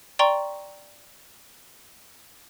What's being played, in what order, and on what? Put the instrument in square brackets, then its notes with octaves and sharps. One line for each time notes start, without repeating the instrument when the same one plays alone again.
[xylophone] D5 G5 A#5 C6 C#6 G7